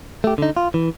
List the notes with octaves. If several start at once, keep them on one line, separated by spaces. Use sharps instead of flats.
A3 G4
D3 D#4
F4
E3